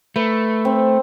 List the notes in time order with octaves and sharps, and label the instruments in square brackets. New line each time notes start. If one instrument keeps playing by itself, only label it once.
[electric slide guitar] A3 [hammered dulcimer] B4
[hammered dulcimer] C4